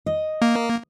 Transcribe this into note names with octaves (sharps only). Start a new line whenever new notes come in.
D#5
A#3